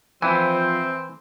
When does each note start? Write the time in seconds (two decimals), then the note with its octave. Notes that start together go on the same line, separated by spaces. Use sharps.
0.22 E3 F3 C4 C5 E5 G5 G#5